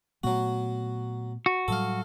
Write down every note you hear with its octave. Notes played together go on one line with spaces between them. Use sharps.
A#2 F#3 A3 B3 F#4
F#4
A2 F#3 G3 A4 F5